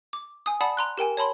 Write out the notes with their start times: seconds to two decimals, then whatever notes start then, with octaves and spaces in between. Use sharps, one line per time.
0.13 D6
0.46 G#5 D#6
0.61 D5 F#5 A5 B5 D#6
0.77 A#5 C6 F#6
0.98 G4 A#4 G5 G#5
1.17 C#5 A5 B5 C6